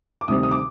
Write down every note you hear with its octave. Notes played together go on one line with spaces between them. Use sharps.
D6
D2 C3 D#3 G3 C4 D#6
D#6
D6